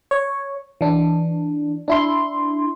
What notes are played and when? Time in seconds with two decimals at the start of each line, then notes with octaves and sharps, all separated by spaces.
0.11 C#5
0.81 E3 D4
1.88 D4 E4 C6